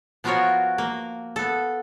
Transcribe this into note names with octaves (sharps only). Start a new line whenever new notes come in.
F3 B3 F4 F#4 A#4 C#5
A#3
B3 A4